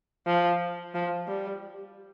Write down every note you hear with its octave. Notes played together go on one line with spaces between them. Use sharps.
F3
F3
G3